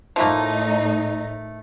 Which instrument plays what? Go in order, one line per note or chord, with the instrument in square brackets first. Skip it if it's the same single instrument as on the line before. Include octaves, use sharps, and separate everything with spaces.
[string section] A2 D#4 [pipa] F3 A3 A#3